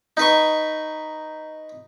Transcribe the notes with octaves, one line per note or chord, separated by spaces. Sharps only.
D#4 B4 C#6